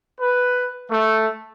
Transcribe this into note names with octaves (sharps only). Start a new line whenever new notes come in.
B4
A3